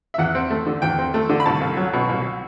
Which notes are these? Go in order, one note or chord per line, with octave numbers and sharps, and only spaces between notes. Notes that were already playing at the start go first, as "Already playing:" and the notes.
E5
E2 F#5
C4
A3
D3
E2 G5
C4
A3
D3
B5
C2 A5
C2
F#3
B2
C2